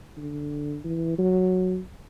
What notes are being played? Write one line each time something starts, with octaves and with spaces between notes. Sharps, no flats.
D3
E3
F#3